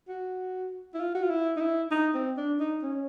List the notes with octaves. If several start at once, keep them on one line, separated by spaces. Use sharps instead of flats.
F#4
E4
F4
F#4
F4
E4
D#4
E4
D#4
C4
D4
D#4
C#4